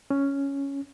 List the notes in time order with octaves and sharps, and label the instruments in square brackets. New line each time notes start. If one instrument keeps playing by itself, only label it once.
[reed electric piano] C#4